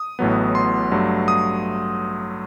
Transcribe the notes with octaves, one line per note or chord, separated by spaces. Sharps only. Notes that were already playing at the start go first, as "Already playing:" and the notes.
Already playing: D#6
A1 A2 F#3 B3
C6
G2 F#3 A3
D#6